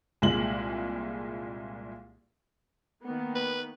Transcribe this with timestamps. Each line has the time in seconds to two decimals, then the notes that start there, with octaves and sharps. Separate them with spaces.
0.22 C2 A#2 G#3 F#7
3.03 D#3 A#3 B3
3.35 B4